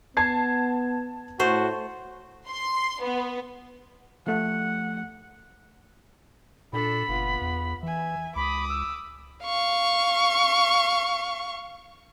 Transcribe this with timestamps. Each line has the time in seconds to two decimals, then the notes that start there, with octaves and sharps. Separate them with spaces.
0.17 B3 A5 G#6 C7
1.39 A2 A3 F#4 C5
2.50 C6
3.02 B3
4.27 F3 A3 F#5
6.73 A#2 D4 A4 B5
7.09 F#1 B3 F4
7.41 E2
7.83 E3 E5 G#5
8.36 C#2 B5 D6 D#6
8.69 E6
9.44 F5 C#6